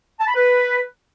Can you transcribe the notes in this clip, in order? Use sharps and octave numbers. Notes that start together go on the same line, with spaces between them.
A5
B5
B4